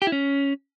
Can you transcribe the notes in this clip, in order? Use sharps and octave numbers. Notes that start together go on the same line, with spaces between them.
G4
E4
C#4